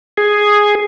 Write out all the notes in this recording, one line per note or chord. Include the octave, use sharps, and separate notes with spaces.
G#4